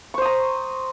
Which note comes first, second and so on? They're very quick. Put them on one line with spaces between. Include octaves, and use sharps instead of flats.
C#6 C5 D#6 A#5